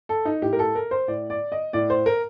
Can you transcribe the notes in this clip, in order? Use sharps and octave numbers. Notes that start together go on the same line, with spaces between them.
A4
D#4
A2 G4
A#4
A4
A#4
C5
A2 D5
D5
D#5
A2 D5
C5
A#4